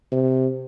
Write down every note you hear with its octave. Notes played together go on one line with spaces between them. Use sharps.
C3